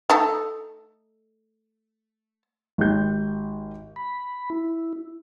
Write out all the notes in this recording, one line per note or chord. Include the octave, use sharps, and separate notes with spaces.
A3 D#4 A4
G#1 G4 G6
B5
E4